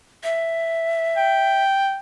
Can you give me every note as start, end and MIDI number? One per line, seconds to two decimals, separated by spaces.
0.24 1.63 76
1.17 1.99 79